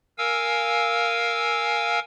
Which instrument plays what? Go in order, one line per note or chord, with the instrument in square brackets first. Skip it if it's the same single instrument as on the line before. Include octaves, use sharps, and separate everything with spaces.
[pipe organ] A#4 F5 G#5 E6